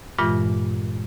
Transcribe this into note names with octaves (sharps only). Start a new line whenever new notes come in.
G2 A#2 E3 G#3 F4